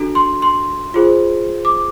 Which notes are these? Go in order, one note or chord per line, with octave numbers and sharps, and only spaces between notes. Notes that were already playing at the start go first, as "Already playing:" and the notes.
Already playing: D4 F#4 A4 A#5
C6
C6
F4 G#4 C5
D6